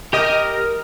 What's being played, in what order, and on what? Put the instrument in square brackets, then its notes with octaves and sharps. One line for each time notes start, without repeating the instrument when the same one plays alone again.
[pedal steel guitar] G4 D#5 D#6 [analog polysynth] A#4